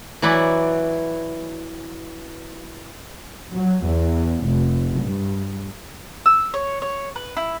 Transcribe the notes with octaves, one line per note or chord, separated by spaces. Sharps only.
E3 F#3 E4 B4 D5
F#3
E2
F1
G2
E6
C#5
C#5
B4
E4